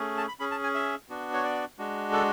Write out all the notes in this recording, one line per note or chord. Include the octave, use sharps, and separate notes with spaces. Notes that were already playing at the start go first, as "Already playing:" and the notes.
Already playing: A3 C#4 G#4
A5
B5
C#4 G#4 B5
A5
G#5
E5
B3 D4 F#4
C#5
D5
G#3 D4 F#4
A4